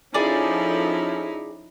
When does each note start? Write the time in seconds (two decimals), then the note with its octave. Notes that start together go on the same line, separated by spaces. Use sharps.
0.14 F3 C#4 D#4 E4 G#4 A4 D5